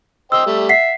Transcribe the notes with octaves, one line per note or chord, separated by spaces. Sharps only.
C5 D#5 G5 E6
G3 A3
E5 F#5 B6 C7